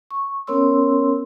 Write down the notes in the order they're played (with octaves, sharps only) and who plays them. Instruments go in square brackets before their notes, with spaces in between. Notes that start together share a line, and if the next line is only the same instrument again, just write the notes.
[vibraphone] C#6
B3 C#4 A#4 C#5 C6 E6